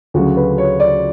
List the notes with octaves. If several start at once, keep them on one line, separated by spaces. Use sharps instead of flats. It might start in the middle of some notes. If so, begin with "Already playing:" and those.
D2 C#3 F#3 F#4
B4
C#5
D5